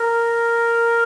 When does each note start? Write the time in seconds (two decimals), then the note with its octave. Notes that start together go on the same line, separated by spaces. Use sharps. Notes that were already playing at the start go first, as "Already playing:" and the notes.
Already playing: A#4